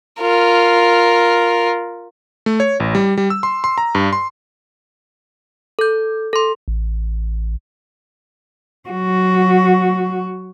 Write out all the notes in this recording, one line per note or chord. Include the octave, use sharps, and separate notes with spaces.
F4 A#4
A3
C#5
A1
G3
G3
E6
C6
C6
A#5
G2
C6
A4 G6
A4 C6
A1
F#3 F#4